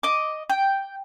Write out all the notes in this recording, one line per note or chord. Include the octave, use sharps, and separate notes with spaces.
D#5 D6
G5